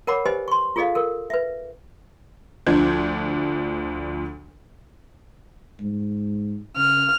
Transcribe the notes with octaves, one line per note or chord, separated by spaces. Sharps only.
A#4 C#5 F#5 B5 D6
G4 B4 C5 D#5 G#5
C6 C#6
F4 G#4 A4 D5 D#5 F5
A4 A#4
B4 E5
D2 F3 D4 G6 G#6
G#2
C#3 F6